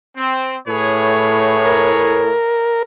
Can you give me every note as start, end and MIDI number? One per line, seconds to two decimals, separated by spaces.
0.16 0.54 60
0.68 2.30 45
0.68 2.35 68
0.68 2.35 71
0.68 2.35 73
1.66 2.83 70